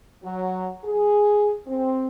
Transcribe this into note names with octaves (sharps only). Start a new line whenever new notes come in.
F#3
G#4
C4